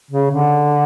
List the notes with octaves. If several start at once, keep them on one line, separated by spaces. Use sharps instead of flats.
C#3
D3